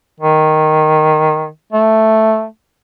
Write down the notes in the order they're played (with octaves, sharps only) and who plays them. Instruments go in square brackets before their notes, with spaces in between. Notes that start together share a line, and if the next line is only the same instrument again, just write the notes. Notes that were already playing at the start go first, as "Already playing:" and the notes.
[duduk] D#3
A3